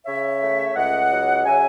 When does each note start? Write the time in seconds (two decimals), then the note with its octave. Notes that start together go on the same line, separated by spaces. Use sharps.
0.06 C#3 C#5 E5
0.42 A3
0.76 C#2 D#5 F#5
1.11 F#3
1.45 C#3 E5 G#5